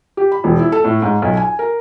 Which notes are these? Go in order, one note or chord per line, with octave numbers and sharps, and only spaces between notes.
G4
B5
E1
E4
A4
A2
G#2
B1
G#5
A#4